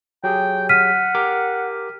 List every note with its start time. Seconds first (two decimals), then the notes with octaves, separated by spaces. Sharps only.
0.24 F#3 G4 G#4 G5
0.69 F#5 F6 B6 D#7
1.15 G4 A#4 D6